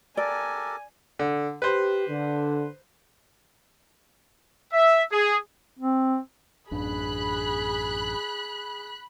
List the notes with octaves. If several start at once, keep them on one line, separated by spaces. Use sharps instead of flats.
G4 A4 A#4 D5 G#5
D3
G4 B4 C5
D3
E5
G#4
C4
A1 F#2 D4 G#4 B5 F#6